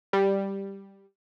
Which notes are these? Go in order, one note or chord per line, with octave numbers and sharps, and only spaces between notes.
G3